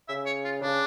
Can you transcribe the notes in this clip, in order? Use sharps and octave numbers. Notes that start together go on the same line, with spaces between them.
C#3 E5
C#5
F4
C#3 D4